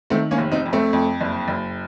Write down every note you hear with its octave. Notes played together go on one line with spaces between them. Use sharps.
D#3 A3 C4
A#3 C#4
F1
C4 D#4
F2
A3 C4
F2
F#1
F#1